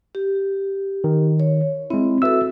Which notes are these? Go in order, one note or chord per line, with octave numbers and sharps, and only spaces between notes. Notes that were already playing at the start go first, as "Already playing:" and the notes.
G4
D#3
C#5
G#3 C4 E4
F#4 A4 B4 E5 E6